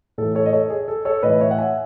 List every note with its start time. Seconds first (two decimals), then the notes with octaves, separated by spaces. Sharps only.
0.18 A2 E3 A4
0.35 A4 C#5
0.46 D#5
0.53 A4 C#5
0.70 G#4
0.88 A4
1.05 A4 C#5
1.23 A2 E3 B4 D#5
1.41 C#5 E5
1.51 F#5
1.58 E5 G#5